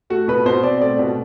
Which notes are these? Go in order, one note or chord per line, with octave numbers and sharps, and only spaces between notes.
A3 F#4
B2 B4
B2 C5
C4 D5
A3 D5
B2